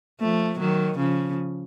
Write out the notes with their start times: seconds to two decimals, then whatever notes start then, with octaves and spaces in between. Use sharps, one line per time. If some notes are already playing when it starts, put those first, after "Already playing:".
0.20 F3 A3
0.59 D#3 F#3
0.98 C#3 F3